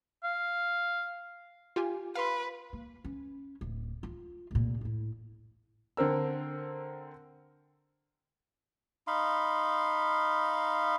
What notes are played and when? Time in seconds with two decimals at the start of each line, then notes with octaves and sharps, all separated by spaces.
0.23 F5
1.76 F4 G4 G#5
2.15 B4 F5 C6
2.73 A#3
3.04 C#4
3.61 D1
4.03 F4
4.51 F1 A#2
4.81 A2 E4
5.97 D3 C4 A#4 E6
9.07 D#4 F5 B5 C6